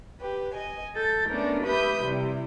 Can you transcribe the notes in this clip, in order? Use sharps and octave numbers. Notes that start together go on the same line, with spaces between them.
G4 B4
D#5 G#5
A4 G6 A6
A3 B3 C#4 D4 A#4
G4 B4 E5 B5 D#6 G6
C3 G3 E4